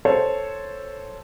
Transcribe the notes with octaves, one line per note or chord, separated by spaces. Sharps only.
A4 C5 C#5